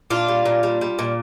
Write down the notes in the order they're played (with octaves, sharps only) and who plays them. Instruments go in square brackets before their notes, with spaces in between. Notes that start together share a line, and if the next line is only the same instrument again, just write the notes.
[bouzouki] A#2 D4 F4
G3
A#2
G3
G3
A#2